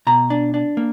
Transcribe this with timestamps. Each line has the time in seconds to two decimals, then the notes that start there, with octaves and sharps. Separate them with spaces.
0.07 B2 A#5
0.30 D4
0.54 D4
0.77 A#3